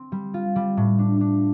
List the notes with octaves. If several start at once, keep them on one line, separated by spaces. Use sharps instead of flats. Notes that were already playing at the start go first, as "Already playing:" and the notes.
Already playing: C4
G3
F4
G3
A2
D4
D4